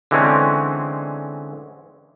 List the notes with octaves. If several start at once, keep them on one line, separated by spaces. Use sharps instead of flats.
D3 E3 G#3 C4 C#4